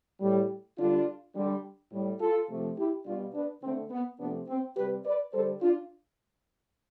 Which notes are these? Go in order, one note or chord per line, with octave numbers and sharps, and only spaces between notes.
A2 G3
D3 G3 D4 F4
D3 G3
A2 G3
F4 A4
C3 F3 A3
E4 G4
B2 G3 D4 F4
B3 D4
D3 A3 C4
B3
C3 F3 A3 B3 D4
C4
C3 G3 G4 B4
B4 D5
D3 G3 A4 C5
D4 F4